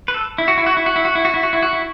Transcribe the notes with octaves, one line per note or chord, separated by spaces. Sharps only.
B4
A4
E4
F#4
E4
F#4
E4
F#4
E4
F#4
E4
F#4
E4
F#4
E4
F#4
E4